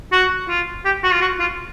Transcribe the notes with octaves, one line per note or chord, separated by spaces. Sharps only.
F#4
F4
G4
F#4
F4
F#4
F4